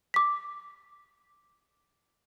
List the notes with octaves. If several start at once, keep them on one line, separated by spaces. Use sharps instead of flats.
D6 B6